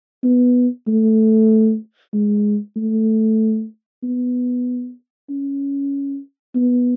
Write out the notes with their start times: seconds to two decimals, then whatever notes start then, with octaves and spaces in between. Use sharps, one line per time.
0.24 B3
0.87 A3
2.13 G#3
2.76 A3
4.03 B3
5.29 C#4
6.55 B3